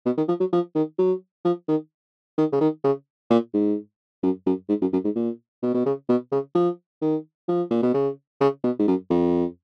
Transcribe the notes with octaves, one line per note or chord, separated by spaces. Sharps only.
B2
D#3
F3
F#3
F3
D#3
F#3
F3
D#3
D#3
C#3
D#3
C#3
A#2
G#2
F#2
F#2
G#2
F#2
F#2
G#2
A#2
B2
B2
C#3
B2
C#3
F3
D#3
F3
A#2
B2
C#3
C#3
B2
G#2
F#2
F2